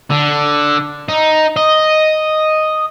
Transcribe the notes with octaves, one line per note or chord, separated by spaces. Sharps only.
D3
D#4
D#5